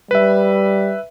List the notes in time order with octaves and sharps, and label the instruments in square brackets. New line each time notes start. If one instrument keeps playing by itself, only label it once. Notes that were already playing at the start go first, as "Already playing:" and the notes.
[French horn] G3 [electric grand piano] B4 E5